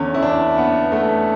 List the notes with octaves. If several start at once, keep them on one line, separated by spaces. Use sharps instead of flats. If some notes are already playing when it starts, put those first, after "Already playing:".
Already playing: E2 D3 C#4
E4
D4
B3
A3